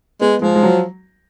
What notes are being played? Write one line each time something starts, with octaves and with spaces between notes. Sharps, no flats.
G#3 B3
F3 G#3
G#3
F#3